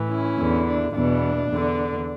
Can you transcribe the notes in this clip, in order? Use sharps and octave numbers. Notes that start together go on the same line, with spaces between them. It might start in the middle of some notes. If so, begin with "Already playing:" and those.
Already playing: A2 E3
C#4 E4
E2 D3
D4
E2 B2 D4
E2 D3